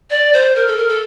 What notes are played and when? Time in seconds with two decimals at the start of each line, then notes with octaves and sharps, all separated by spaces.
0.10 D5
0.33 C5
0.56 A#4
0.67 A4
0.77 A#4
0.89 A4